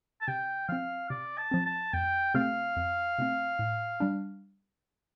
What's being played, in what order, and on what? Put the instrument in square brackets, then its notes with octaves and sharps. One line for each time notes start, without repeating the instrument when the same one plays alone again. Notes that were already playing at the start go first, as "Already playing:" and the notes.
[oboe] A5
[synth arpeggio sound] C3 [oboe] G5
[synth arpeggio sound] F3 C4 [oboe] F5
[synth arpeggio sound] C3 [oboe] D5
[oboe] A5
[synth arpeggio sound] F3 C4
[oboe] A5
[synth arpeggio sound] F2 [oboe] G5
[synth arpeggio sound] C3 A3 C4 [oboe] F5
[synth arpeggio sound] F2
C3 A3 C4
A2
G3 D4